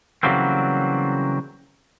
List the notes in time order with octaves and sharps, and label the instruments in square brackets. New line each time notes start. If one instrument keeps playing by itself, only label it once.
[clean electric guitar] C#3 E3 F#3 G3 A#3 C4